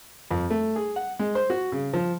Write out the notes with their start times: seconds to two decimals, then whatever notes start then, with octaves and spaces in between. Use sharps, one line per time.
0.31 F2
0.50 A3
0.76 G#4
0.96 F#5
1.19 G#3
1.35 C5
1.50 F#4
1.72 C#3
1.93 F3